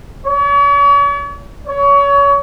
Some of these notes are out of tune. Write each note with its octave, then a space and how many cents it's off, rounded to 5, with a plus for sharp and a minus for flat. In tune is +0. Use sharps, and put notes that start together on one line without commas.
C#5 +45
C#5 +30